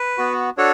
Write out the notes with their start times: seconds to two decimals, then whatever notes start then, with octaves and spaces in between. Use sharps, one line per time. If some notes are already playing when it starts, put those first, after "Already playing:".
Already playing: B4
0.18 B3 F#4
0.57 D4 F#4 A4 C#5